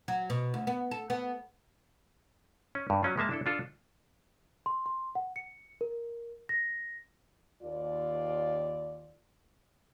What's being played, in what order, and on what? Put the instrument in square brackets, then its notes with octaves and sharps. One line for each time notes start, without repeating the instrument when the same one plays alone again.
[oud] F#3
B2
D2
B3
A4
B3
[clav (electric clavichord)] C#4
G2
F#3 C#4 F4
G#3 A#3 E5 A5
D4 E4 A4
D4 F4 A4
[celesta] C6
C6
F#5
C#7
A#4
A#6
[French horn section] D#2 F4 D5